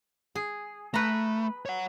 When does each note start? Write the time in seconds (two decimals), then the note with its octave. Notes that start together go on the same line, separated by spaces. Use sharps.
0.35 G#4
0.94 A3 B4 A#5
1.66 C#5 F#5